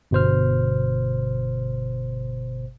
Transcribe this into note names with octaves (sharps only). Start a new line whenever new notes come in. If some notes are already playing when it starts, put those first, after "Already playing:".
G1 B2 C5 F6